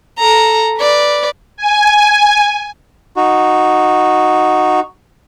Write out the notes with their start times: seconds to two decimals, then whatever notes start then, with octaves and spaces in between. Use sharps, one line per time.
0.19 A4 A#5
0.78 B4 D5
1.57 G#5
3.16 D#4 F#4